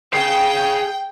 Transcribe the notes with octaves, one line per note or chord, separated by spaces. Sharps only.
G#4 F5 G5